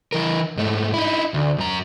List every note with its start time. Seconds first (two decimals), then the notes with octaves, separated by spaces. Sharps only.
0.12 E3 A#4
0.57 G#2 A3
0.94 D#4 E4
1.34 D2
1.58 F#2 A#5